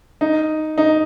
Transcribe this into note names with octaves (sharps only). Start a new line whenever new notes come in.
D#4
D#4